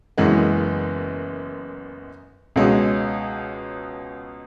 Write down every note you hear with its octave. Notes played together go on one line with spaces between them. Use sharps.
F#1 F#2 E3 G#3 B3
C#2 B2 G#3 C#4